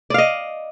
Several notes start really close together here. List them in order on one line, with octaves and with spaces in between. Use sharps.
D5 F5 D#5